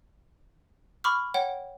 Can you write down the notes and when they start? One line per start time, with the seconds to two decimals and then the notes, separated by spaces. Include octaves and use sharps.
1.04 B5 C#6 D6 F6
1.34 C#5 F#5 G5